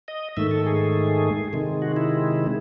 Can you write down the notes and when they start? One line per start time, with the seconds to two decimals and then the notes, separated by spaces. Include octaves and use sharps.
0.08 D#5
0.37 G#2 D#3 A3 E5
0.51 A4
0.66 G#4
1.53 C3 D#3 G#3
1.82 F#4
1.96 E4